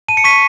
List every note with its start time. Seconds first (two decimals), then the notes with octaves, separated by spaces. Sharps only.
0.08 A5 D#7
0.17 C#7
0.24 C#6 B6 D#7